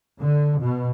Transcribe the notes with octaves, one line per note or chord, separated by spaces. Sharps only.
D3
B2